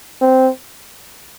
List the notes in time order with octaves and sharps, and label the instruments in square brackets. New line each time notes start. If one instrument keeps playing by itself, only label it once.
[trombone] C4